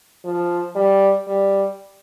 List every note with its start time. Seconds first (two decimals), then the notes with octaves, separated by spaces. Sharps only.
0.25 F3
0.76 G3
1.28 G3